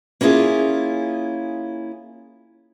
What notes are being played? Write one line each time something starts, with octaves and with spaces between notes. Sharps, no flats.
A#3 C#4 E4 F4 G#4